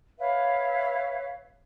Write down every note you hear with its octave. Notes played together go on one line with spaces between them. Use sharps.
B4 C#5 E5 F5